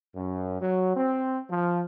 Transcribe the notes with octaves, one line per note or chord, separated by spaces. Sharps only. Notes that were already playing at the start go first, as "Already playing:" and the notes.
F#2
F#3
C4
F3